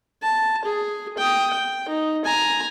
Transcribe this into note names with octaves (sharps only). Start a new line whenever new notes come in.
A5
G#4
G5 D#6
G5
D#4
G#5 A#5